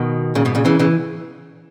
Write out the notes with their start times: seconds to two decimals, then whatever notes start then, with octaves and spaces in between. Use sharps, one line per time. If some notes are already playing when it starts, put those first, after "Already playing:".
Already playing: B2 D#3
0.35 A#2 C#3
0.45 G#2 B2
0.55 A#2 C#3
0.65 C#3 E3
0.79 C#3 E3